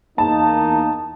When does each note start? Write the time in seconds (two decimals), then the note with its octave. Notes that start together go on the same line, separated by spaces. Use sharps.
0.18 E2 A#3 D#4 A5